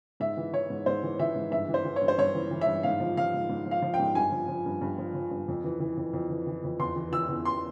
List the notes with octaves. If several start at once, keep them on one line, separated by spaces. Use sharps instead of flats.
G#2 E5
E3
E3 C#5
G#2
G#2 C5
E3
E3 E5
G#2
G2 E5
E3
C5
E3
C#5
G2
C5
G2 C#5
E3
E3
E5
G2
G#2 F5
F3
F3 F5
G#2
G#2
F3 F5
F3
G5
G#2
G2 G#5
F3
F3
G2
G2
F3
F3
G2
F2
E3
E3
F2
F2
E3
E3
F2
E2 C6
E3
E3 E6
E2
C6